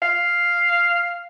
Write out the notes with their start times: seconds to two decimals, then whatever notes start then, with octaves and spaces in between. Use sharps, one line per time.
0.02 F5